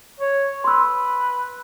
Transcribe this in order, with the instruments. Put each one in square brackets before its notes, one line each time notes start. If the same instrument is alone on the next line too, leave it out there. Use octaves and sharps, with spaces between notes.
[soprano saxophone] C#5
[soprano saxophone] B4 [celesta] C6 E6